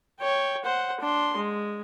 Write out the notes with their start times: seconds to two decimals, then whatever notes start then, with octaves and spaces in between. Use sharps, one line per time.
0.19 C#5 G5
0.64 C5 F#5
1.00 D4 C6
1.36 G#3